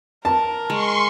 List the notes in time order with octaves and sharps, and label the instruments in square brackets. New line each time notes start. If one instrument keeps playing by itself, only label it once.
[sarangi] A#4 [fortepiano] A5
[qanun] G#3 [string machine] C6 C#6